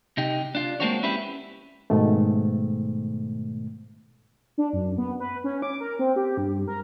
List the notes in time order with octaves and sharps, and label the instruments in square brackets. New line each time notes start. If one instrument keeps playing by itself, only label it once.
[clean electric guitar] C3 D#4 G4
D4 F4
G#3 A#3 C4 D4 F#4 C#5
C#4 E4 G4 B4
[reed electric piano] G#2 B2 D#3 A3
[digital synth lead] D4
F#2
B3
B4
C#4
D6
A#4
C4
G4
G2
A#4